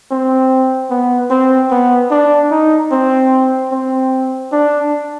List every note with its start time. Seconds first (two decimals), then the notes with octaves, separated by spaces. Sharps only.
0.11 C4
0.90 B3
1.30 C4
1.71 B3
2.11 D4
2.51 D#4
2.92 C4
3.72 C4
4.52 D4